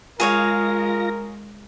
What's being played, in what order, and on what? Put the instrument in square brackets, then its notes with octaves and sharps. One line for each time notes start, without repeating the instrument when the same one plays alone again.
[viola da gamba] G#3 [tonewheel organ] F4 A#6 [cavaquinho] G#4 C#5 F5 [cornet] A#4